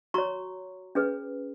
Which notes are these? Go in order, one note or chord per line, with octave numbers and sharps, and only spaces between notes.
F#4 C#5 A#5 C#6
C#4 G#4 B4